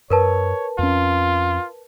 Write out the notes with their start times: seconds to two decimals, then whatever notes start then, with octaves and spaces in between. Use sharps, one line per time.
0.10 F#2 A#4 B4 C#5 A5
0.79 F2 C#4 F4